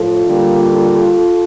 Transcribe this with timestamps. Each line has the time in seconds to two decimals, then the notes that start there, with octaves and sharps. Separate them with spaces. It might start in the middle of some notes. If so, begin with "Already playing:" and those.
Already playing: A2 F3 F4 A4
0.26 D3 G3 A#3